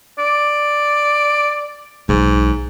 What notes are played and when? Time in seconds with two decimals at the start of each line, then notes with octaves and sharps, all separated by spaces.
0.18 D5
2.09 B1 G#2